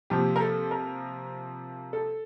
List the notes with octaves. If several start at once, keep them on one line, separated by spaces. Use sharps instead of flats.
C3 F3 A#3 G4
A#4
A4
A#4
A4